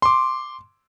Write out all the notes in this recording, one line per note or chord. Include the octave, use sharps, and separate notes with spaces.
C6 D6